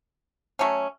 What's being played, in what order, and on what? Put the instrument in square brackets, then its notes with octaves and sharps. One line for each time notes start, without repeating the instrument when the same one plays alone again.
[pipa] F#3 A3 C#4